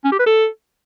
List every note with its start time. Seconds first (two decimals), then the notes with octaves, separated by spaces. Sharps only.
0.04 C#4
0.12 G4
0.19 B4
0.27 A4